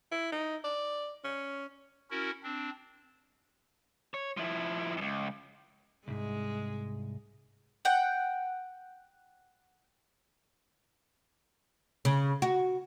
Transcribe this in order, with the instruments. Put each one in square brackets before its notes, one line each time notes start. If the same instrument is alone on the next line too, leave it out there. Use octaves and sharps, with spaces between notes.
[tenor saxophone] E4
D#4
D5
C#4
[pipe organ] C#4 E4 F#4 A#4
C4 D4
[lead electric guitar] C#5
F3 E4
C#2 F#2
[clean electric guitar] C2 G#2 [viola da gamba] G#3
[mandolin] F#5 G5
[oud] C#3
F#4